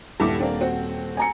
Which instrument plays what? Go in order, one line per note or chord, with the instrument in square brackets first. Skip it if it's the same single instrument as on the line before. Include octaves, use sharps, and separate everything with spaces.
[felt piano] D#1 [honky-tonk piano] G2 E4 D6
[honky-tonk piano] A#3 C4 D4
C4 F#4
[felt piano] G#5 A#5 C#7